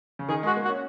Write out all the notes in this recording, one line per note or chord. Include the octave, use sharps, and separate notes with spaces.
C#3
D#3 G#4
G#3 F#4
A#3
F#4
C#4